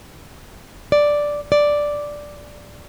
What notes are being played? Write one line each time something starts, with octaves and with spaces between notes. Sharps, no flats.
D5
D5